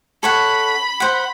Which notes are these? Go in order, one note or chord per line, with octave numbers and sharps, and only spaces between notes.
A4 C#5 F#5 B5
C5 F#5